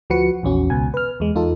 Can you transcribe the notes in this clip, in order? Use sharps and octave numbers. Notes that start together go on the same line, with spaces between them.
D2 F3 F#4 B4 C#7
A#1 E2 C#4 F#4
C#2 B2 G#5
B4 F6
E2 G#3
E2 D#4 F4 A4